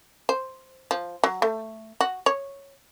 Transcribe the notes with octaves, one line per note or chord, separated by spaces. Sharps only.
C5
F3
F#3
A3
F#4
C#5